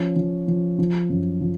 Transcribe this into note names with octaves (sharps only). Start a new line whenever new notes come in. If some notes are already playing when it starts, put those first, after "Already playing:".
Already playing: F3 C#4
F3
F3
F3
F#2
F3